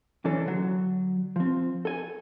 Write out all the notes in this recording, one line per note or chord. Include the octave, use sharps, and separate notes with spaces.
E3 C#4 D4 A4
D3 F#3
F3 C4
A4 G#5